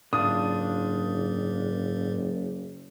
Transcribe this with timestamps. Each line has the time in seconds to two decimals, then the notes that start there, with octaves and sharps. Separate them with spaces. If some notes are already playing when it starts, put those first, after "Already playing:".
0.13 F#1 G#2 D4 F4 A5 D#6